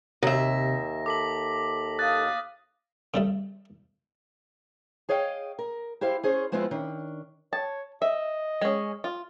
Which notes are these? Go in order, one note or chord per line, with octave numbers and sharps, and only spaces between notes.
D#2 C3 E5 A#6
A4 D6 B6 F#7
F5 D#6 F#6 A6
C#3 G3 A3
G#4 C#5 D#5 F5 G5
A#4
E4 G4 C5 F5
C#4 G#4 C5 C#5
F3 G#3 B3 C4 E4 F4
D#3 C#4 D4
C#5 A5
D#5 E5
G#3 C#4
F4